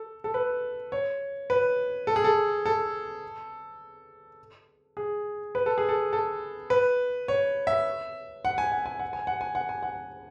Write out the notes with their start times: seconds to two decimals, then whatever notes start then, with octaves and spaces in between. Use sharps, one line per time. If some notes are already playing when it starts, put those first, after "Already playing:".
Already playing: A4
0.24 A4
0.34 B4
0.92 C#5
1.50 B4
2.07 A4
2.16 G#4
2.24 A4
2.66 A4
4.97 G#4
5.55 B4
5.66 A4
5.78 G#4
5.89 A4
6.13 A4
6.70 B4
7.28 C#5
7.67 E5
8.45 F#5
8.58 G#5
8.72 F#5
8.86 G#5
8.99 F#5
9.13 G#5
9.27 F#5
9.41 G#5
9.55 F#5
9.69 G#5
9.83 F#5